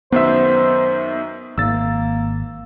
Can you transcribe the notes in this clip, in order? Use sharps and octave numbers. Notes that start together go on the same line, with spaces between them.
F#2 D#3 B3 C5 E5
G#1 A#3 E6 A6